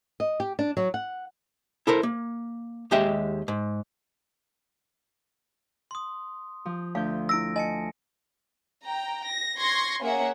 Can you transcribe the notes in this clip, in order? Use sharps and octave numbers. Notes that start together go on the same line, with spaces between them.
D#5
G4
D4
F#3
F#5
E4 A4 A#4 C5
A#3
D#2 G#3 G4 D#5 E5
G#2
C6 D#6
F3
D2 F5 G6
E4 E6 A#6 D7
D#5 G#5 A5 C#7
G5 A#5
A#6
C6 C#6 G#6 A#6 C7
A#3 C#4 G#4 A#4 E5 F#5